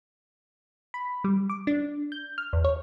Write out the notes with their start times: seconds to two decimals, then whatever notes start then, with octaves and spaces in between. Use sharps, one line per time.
0.94 B5
1.24 G3
1.50 D6
1.67 D4
2.12 G6
2.38 F6
2.53 E2
2.64 C#5